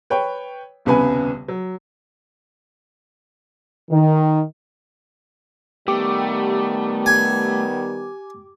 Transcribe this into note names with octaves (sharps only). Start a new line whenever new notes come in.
B4 C#5 G5
D#1 C2 C#3 B3 B4 G#5
F#3
D#3
D#3 G3 A3 B3 G4 D6
G#5